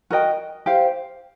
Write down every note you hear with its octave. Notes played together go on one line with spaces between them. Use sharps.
F#4 A#4 D#5 G5
G4 C5 F5